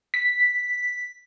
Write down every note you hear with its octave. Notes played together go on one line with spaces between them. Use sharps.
B6